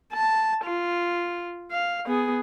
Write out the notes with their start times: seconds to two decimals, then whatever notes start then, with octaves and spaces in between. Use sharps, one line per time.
0.13 A5
0.64 F4
1.72 F5
2.06 B3 G#4